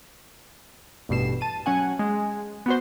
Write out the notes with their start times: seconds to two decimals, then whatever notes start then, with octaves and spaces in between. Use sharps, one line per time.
1.09 A1 G2 B2 C7 E7
1.41 A5 D#7
1.66 F#3 C#4 F#5 G#5
1.99 G#3
2.66 B3 F#4 C5